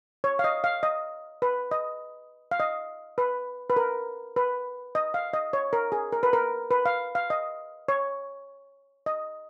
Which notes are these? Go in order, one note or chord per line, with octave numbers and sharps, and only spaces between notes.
C#5
F5
D#5
F5
D#5
B4
D#5
F5
D#5
B4
B4
A#4
B4
D#5
F5
D#5
C#5
A#4
G#4
A#4
B4
A#4
B4
F5
F5
D#5
C#5
D#5